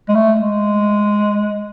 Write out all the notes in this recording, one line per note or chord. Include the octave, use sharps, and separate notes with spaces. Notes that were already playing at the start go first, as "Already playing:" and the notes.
G#3
A3
G#3